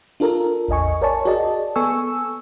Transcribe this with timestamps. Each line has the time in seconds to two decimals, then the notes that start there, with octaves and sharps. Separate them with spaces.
0.20 D4 F4 A4 A#4
0.68 A1 E2 D#5 G#5 C#6
1.02 A#4 C#5 D5 G#5 A5 C#6
1.25 F#4 G#4 D5 D#5 A5
1.76 B3 A4 G#5 C#6 E6